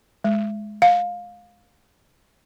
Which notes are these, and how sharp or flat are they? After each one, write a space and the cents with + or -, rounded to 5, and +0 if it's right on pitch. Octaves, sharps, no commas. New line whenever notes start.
G#3 +15
F5 +20